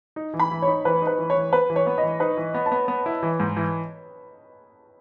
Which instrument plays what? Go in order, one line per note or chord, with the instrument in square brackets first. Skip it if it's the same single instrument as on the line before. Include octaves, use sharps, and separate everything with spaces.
[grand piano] D#4
E3
[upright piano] B5
[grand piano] E3
[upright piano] C#5
[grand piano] D#4
[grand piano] E3 [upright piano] B4
[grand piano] D#4
[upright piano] B4
[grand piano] E3
[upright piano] C#5
[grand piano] E3
[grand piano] B3 [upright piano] B4
[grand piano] E3
[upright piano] C#5
[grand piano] B3
[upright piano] D#5
[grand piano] E3
[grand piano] D#4 [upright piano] B4
[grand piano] E3
B3
[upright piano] A5
[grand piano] B3
B3
E4
E3
G#2
E3